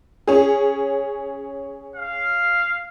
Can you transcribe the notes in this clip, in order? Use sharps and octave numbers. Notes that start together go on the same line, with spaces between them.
C#4 G#4
F5